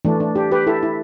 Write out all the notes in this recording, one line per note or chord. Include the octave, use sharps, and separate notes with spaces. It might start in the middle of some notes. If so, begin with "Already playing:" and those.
E3 A3 D4
D4
D4 G4
G4 B4
E4 A4
E4